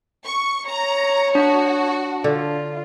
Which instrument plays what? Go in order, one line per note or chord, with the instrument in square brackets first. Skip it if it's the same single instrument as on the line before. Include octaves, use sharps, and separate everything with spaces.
[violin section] C#6
[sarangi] C#5 [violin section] A#5
[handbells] D4 [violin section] F#4
[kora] D3 [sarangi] F4